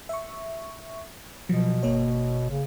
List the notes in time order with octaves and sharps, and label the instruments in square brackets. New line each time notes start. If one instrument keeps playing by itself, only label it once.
[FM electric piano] E5 C#6
[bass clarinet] B2 [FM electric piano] F3 F#3
[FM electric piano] G1 A#3 C#5
[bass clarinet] C#3